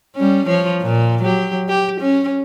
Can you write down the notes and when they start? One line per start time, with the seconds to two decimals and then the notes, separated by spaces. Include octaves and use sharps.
0.15 G3 C#4
0.46 F3 C#5
0.82 A#2
1.22 F#3 G4
1.69 G4
2.01 C#4